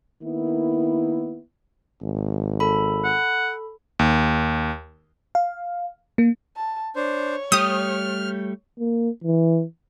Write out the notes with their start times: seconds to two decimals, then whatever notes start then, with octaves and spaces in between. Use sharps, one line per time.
0.22 D#3 A#3 B3 E4
2.02 G#1
2.60 A4 B5
3.04 F#5
3.99 D#2
5.35 F5
6.18 A#3
6.56 A5
6.96 D4 C5 C#5
7.52 G3 A3 G4 D#6 F6
8.79 A#3
9.24 E3